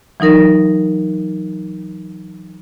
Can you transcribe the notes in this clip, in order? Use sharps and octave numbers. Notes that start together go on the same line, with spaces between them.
E3 F#3 D#4 A#4 A#6